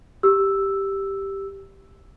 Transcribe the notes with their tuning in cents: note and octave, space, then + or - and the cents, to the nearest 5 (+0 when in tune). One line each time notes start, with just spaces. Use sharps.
G4 +0 E6 +0